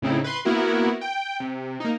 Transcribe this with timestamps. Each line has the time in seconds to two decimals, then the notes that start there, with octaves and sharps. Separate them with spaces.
0.02 A2 C#3 C4 D#4 E4
0.24 B4 C6
0.45 A#3 B3 E4 F#4 A#4
1.01 G5
1.40 C3
1.80 A#3 D#4